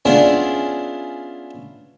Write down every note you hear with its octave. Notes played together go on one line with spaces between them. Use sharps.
B3 C#4 D4 E4 F4 G#4